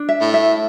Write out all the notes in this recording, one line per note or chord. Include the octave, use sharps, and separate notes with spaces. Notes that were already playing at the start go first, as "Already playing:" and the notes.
Already playing: D4
E5
A2
E5